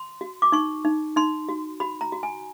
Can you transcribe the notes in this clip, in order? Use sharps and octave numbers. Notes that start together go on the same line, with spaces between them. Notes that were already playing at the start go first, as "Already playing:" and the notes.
Already playing: C6
F#4
D6
D#4 C#6
D#4
D#4 C6
F#4
F#4 B5
A#5
F#4
G#5